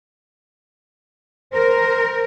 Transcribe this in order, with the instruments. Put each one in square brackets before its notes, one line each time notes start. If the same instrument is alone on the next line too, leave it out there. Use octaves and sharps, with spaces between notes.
[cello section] A#4 [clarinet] C5